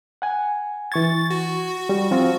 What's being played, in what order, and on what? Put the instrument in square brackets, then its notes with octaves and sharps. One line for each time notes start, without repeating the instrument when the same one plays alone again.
[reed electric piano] F#5 G#5
[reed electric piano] E3 C#6 G#6 [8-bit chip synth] A6
[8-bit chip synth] F#4
[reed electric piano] G3
F3 C4 F4